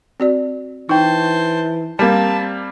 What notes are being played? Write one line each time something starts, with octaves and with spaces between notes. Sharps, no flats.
C4 F#4 D5
E3 D#4 C5 G5 A5
G3 A#3 C4 A5